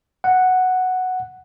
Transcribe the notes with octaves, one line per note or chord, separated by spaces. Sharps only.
F#5